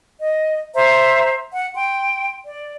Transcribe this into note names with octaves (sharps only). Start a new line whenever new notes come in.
D#5
C5 E5 A#5
F#5
G5 C6
D5